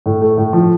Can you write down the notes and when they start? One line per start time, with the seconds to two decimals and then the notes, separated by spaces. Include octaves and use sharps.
0.06 A2
0.21 A3
0.38 A2
0.53 F3